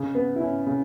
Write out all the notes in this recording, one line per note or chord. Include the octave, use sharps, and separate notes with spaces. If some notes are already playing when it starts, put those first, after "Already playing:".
Already playing: C#3
B3
E4
C#4
C#3